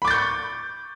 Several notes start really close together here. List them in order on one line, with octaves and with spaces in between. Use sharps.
B5 D6 A6 G6 C#6